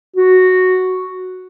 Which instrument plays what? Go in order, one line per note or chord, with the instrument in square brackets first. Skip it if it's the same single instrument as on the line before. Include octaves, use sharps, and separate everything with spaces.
[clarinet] F#4